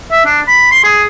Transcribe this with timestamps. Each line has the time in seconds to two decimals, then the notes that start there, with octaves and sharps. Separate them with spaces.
0.11 E5
0.26 D4
0.48 B5
0.72 C6
0.84 G#4